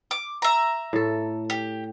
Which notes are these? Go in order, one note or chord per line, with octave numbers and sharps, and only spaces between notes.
D6
E5 A#5
A2 A4
G4